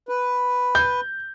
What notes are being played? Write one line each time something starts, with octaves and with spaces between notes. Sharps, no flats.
B4
G6